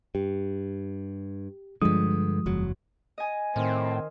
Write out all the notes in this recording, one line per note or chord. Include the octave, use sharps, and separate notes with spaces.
G2 G4
G2 D3 F3 G#3 D#6
F#1 E2 F#3
D#5 G#5
A2 D#3 C4